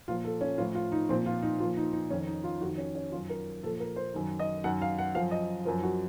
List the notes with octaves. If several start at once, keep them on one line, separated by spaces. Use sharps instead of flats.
A#2 F3 F4
A4
C#4
A2 F3 F4
F4
D#4
A#2 F3 C4
F4
D#4
A#2 F3 F4
D#4
D#4
F2 D#3 C#4
D#4
F4
F2 F#4
D#3
C#4
C#4
F#2 D#3 F4
A#4
A#2 F3 A4
A#4
C5
F#2 D#3
D#5
F#2 D#3 F#5
F5
F#5
F#2 F3 F5
D#5
F#2 F3 A#4
F#4